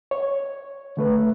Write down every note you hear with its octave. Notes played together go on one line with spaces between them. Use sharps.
C#5
D3 A3 B4